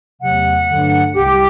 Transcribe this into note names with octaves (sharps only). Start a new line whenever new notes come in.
E2 C3 F#3 A3 F#5
G2 D3 F#3 A3
C2 C3 G3 G4